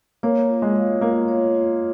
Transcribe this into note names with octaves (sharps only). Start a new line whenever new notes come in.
A#3 C#5
F4
G#3
F5
A#3 F4
C#5
F4